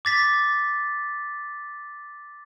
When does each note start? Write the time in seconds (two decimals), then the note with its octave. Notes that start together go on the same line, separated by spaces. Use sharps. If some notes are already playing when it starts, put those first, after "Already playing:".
0.05 D6 A6 B6